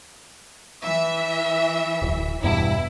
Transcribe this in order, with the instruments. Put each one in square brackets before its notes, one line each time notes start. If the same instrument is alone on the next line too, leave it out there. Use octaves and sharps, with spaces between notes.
[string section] E3 E5
[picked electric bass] D1
[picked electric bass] E2 G2 B2 [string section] E4